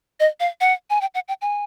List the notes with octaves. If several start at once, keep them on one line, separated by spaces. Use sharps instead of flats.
D#5
F5
F#5
G#5
G5
F#5
G5
G#5